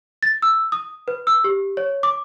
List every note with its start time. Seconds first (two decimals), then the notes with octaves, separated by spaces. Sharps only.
0.23 A6
0.42 E6
0.72 D#6
1.08 B4
1.27 E6
1.44 G4
1.77 C#5
2.03 D6